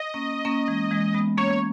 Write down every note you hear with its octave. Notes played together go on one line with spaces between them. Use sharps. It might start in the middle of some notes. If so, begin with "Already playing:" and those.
Already playing: D#5
A#3 C#4
A#3 C#4
E3 G#3
E3 G#3
G#3 B3
A#3 C#4 C#5